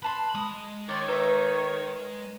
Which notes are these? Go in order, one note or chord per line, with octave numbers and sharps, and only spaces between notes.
B4 A5 B5 C6
G#3 D#6
D#3 C#5 D5 C6
D#4 B4 D#5 E5